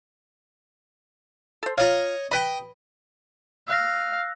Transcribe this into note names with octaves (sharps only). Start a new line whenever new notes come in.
A4 C5
F4 C#5 D#5 F5 A#5
B4 D#5 G5 B5
F5 E6 F#6 A#6